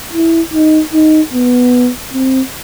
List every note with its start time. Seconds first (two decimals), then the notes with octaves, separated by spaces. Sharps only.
0.13 E4
0.54 D#4
0.93 D#4
1.33 B3
2.13 C4